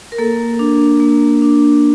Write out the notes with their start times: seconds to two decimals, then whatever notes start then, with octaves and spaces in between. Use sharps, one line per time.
0.12 A#4
0.18 A#3 A4
0.59 D4
1.00 A#3
1.42 D4